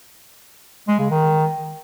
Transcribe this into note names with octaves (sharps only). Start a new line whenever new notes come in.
G#3
C#3
D#3